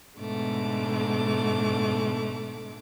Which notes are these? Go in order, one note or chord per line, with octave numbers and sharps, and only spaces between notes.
G#2 B2 D3 A3 D6